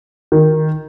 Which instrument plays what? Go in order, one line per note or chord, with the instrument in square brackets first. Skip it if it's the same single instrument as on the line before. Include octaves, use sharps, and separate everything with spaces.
[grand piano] D#3